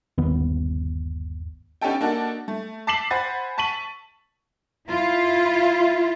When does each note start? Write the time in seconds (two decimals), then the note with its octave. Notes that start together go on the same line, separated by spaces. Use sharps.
0.18 G1 D#2 D#3 B3
1.81 B3 C#4 D#4 G4 A4 G5
2.01 A#3 D4 D#4 F#4 A4
2.48 A3
2.87 A5 D6 B6 C7 E7 F#7
3.11 C5 F#5 G#5 B5 A6
3.58 A5 C#6 B6 D#7 F#7
4.87 E4 F4